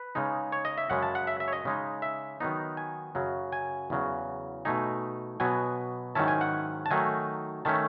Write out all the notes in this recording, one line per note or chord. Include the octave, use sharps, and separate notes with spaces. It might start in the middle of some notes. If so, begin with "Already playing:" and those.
Already playing: B4
C#3 G#3 D#4
C#5
D#5
E5
F#2 C#3 G#3 F#5
A5
F#5
E5
E5
C#5
D#5
C#3 G#3 D#4
E5
D#3 F#3 B3 D#4
G#5
F#2 C#3 F#3
G#5
E2 C#3 F#3
B2 A3 D#4 G#5
B2 F#3 B3 G#5
G#2 D#3 F#3 C#4 E4 A5
G#5
F#5
A5
D#3 F#3 A3 D#4 G#5
D#3 A3 C#4 A5